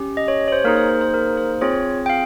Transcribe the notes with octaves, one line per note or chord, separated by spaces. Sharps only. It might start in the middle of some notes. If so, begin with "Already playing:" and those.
Already playing: C#4 G4
D#5
C#5
C#5
C5
A#3 D#4 G#4 A#4
C5
C5
C5
A#4
C5
C4 F4 G#4 C#5
G5
F5